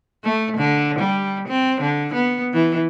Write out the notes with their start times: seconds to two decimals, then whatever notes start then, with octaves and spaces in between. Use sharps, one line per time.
0.24 A3
0.57 D3
0.99 G3
1.48 C4
1.81 D3
2.14 B3
2.53 E3